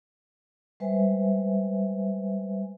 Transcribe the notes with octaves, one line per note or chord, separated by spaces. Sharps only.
G3 G#3 B4 C5 E5 G#5